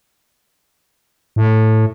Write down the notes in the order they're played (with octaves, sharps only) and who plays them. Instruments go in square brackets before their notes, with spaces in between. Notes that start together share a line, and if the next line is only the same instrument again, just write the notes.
[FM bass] A2